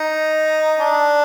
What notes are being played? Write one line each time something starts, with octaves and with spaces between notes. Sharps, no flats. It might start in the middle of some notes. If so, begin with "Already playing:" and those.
Already playing: D#4
D4